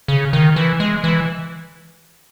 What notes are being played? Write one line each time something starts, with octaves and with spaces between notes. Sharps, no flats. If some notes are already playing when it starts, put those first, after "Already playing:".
C#3
D#3
E3
G#3
E3